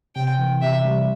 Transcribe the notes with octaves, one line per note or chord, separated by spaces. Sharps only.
C3 G5
E3
C3 E5
G3